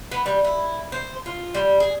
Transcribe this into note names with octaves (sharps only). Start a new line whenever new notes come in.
B3
G3
E4
C5
F4
G3
G#4